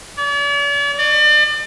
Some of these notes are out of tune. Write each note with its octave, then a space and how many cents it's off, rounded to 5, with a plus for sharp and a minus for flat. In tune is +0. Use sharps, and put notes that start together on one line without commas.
D5 -45
D5 +35